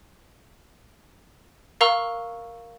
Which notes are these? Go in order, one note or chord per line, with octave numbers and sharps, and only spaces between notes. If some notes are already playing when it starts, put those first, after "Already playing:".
A#4 F5 A#5 C#6 E6